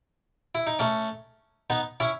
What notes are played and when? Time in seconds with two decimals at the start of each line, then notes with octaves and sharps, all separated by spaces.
0.55 E4
0.67 D#4
0.79 A3 C#4
1.70 B3 D#4
2.00 C#4 E4